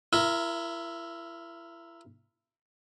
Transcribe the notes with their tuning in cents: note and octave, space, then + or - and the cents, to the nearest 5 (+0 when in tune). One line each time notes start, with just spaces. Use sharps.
E4 +35 A#4 +0 E5 +0